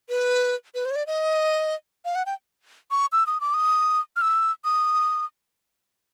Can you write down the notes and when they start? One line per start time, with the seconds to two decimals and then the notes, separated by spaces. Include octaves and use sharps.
0.09 B4
0.75 B4
0.85 C5
0.91 C#5
0.96 D5
1.07 D#5
2.05 F5
2.15 F#5
2.26 G5
2.91 C#6
3.12 E6
3.27 D#6
3.41 D6
3.54 D#6
4.16 F6
4.21 E6
4.65 D#6